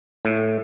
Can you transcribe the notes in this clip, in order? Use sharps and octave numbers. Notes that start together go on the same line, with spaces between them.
A2